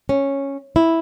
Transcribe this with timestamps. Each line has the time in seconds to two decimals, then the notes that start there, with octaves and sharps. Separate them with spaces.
0.09 C#4
0.76 E4